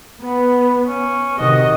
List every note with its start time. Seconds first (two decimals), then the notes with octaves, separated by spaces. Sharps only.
0.22 B3 B4
0.86 C#4
1.38 C3 D#3 F#4 D#5